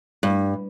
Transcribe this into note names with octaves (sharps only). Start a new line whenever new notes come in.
G2